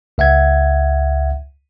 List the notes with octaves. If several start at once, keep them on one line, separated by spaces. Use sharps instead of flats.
C#2 E5 F#5 G#6